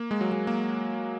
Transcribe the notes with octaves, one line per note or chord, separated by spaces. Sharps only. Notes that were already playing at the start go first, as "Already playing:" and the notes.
Already playing: A#3
G#3
F#3
G#3
A#3